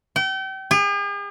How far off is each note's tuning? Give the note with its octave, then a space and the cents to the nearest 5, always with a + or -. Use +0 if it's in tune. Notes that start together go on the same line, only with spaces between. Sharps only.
G5 -35
G#4 -45